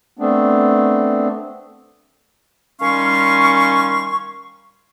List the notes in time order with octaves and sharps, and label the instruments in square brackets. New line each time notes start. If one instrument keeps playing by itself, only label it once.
[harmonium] A3 B3 C4 D4
[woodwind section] D#3 G3 C#4 F5 C6 C#6